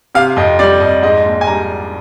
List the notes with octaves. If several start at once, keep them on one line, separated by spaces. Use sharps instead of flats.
C3 F5
F2 D#5
G3 D5
F2 D#5
G#2 D#5
A#1
G#5
G3 A#5